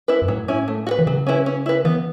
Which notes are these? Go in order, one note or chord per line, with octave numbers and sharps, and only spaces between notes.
E4 B4
F#2
A2 F#3
C#4 E4
A3
F#4
B4
E3
C#3 F#3
C#4 E4 B4
C#4
E4 B4
E3 B3